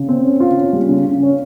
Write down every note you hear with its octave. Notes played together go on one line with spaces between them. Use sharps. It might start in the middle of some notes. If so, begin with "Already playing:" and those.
Already playing: C#3
C4
C#4
F4
C#4
G3
C#3
C#3
C#4